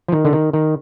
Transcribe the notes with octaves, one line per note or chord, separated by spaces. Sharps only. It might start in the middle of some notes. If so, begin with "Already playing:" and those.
F3
D#3
D3
D#3
D#3